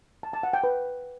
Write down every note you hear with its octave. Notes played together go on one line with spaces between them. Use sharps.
A5
A5
F#5
G5
B4